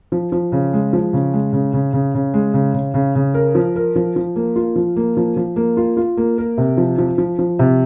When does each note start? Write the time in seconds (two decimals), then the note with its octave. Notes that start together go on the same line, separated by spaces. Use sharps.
0.12 F3
0.32 F3
0.52 C#3
0.73 G#3
0.93 F3
1.13 C#3
1.33 G#3
1.53 C#3
1.73 C#3
1.93 C#3
2.14 C#3
2.34 G#3
2.54 C#3
2.74 C#3
2.94 C#3
3.15 C#3
3.34 A#4
3.55 F3
3.76 A#4
3.96 F3
4.16 F3
4.36 A#3
4.56 F4
4.76 F3
4.96 A#3
5.17 F3
5.37 F3
5.56 A#3
5.77 F4
5.97 F4
6.17 A#3
6.38 A#4
6.58 C3
6.77 F3
6.98 F3
7.18 F3
7.39 F3
7.59 C3